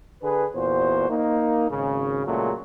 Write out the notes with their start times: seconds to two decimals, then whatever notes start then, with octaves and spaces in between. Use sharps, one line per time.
0.22 D3 G#4 B4
0.55 E2 A#2 F#4 C5
1.10 A#3 D#4
1.70 G#1 C#3
2.26 A#2 C#3 F#3 G#3 A3